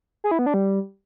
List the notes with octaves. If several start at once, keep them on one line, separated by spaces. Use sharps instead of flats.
G#4
E4
B3
D4
G3